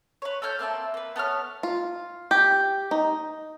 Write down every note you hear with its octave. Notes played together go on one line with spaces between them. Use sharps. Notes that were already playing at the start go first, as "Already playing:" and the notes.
B4 C#5
A4 C#5 F6 G6
A#3 C4 E5 A5
A#3 B4
B3 A4 C#5 F6
F4
G4
D#4